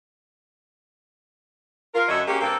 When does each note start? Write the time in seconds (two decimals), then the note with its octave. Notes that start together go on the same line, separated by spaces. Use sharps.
1.94 F4 A#4
2.08 F#2 D3 F#3 C#5 D#5 E5
2.27 G#3 A#3 C#4 F#4 G4
2.40 G2 A#3 C4 A4